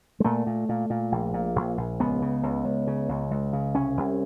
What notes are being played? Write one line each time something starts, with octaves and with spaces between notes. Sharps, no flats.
G#3
A#2 A3
A#2
A#2
A#2
A#1
A#2
A#1
A#1
C#2 B3
C#3
C#2
C#2
C#3
C#2
C#2
C#3
C2 C#4
C2